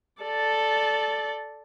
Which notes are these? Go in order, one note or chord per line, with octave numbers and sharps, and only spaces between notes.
A4 D5